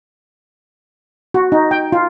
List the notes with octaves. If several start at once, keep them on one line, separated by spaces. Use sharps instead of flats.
F#4
D#4
G5
F4